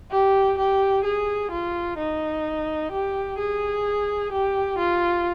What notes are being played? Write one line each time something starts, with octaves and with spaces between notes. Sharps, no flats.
G4
G4
G#4
F4
D#4
G4
G#4
G4
F4